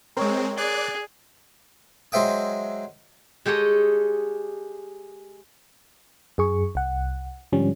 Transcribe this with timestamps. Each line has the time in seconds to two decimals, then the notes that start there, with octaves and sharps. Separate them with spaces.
0.17 G#3 C4 A#4 C#5
0.57 G#4 D5 F#6
2.12 F#3 G#3 C5 E5 G5 D#6
3.46 G#3 G4 A4 C#5 D#5
6.38 F#2 G#4 C#6
6.75 C2 F#5
7.53 G#2 D3 F3 G3 C#4